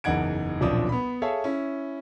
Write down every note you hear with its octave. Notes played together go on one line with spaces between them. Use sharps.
F#1 E2 D#4 F#5 G#6 D7
D#1 B1 F3 C4 D4 D#6
B3 B5
G#4 A4 C#5 E5 F5
C#4 E4